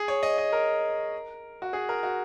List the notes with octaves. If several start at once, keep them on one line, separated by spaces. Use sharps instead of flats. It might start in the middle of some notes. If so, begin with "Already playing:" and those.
Already playing: G#4
C#5
D#5
D#5
A#4
F#4
G#4
A#4
F#4